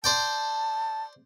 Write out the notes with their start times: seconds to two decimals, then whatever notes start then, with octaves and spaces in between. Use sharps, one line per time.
0.04 C5 D5 G5 A5